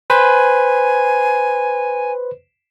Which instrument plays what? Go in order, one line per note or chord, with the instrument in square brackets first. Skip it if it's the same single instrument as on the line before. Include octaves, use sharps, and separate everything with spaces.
[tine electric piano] B4 C5 [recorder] G#5